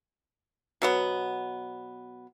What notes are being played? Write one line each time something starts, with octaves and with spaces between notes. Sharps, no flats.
B2 F#3 B3